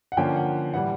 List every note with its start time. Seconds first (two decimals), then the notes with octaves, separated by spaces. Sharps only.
0.12 F#5
0.17 D3 F3 A#3 C#4 G5
0.36 F#5
0.74 A2 E3 G3 F#5